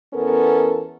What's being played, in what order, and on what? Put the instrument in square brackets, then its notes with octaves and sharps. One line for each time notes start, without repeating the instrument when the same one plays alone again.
[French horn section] E2 B3 C#4 A4 A#4